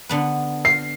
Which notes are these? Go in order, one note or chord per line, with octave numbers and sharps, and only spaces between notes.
D3 B3 B4
C7